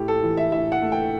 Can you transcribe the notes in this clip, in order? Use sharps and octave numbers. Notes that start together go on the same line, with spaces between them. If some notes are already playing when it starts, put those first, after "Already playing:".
Already playing: A2 G4
A4
E3
E5
A2 E5
F#5
A3
G5